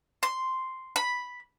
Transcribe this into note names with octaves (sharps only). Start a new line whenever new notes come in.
C6
B5